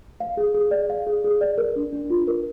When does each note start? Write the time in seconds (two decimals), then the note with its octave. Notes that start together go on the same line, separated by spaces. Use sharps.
0.20 F5
0.37 G#4
0.54 G#4
0.71 D5
0.90 F5
1.06 G#4
1.24 G#4
1.41 D5
1.58 A#4
1.76 D4
1.93 D4
2.10 F4
2.27 A#4